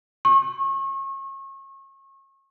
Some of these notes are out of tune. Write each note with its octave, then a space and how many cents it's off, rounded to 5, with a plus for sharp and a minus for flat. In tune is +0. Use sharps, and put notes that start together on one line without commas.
C#6 -35